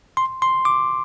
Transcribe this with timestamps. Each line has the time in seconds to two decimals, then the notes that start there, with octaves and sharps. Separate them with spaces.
0.17 C6
0.42 C6
0.65 D6